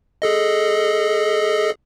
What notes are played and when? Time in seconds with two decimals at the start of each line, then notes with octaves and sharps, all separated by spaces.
0.22 G#4 A4 D#5